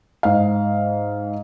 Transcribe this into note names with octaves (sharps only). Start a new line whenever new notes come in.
G#2 F5